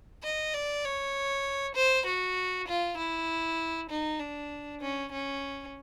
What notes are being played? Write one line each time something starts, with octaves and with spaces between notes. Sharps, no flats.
D#5
D5
C#5
C5
F#4
F4
E4
D#4
D4
C#4
C#4